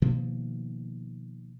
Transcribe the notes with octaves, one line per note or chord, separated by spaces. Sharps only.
B2 D#3 F3 A#3